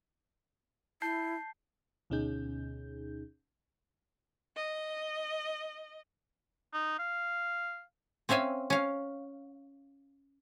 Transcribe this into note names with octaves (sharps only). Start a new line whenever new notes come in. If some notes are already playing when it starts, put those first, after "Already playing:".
E4 A5 G6 C7
D2 B2 C#4 D#4 G#4 G6
D#5
D#4
F5
C4 C#4 E5 F5 G#5
C#4 F5